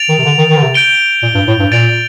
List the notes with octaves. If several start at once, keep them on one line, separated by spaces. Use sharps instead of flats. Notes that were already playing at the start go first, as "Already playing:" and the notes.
Already playing: A6 D7 F7
D#3
C3
D3
D#3
D#3
D3
C3
G6 D7 G7
A#2
G2
A2
G2
A#2 A6 D7 F7